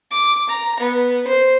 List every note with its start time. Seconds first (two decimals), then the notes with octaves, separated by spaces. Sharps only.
0.11 D6
0.49 A#5
0.80 B3
1.28 C5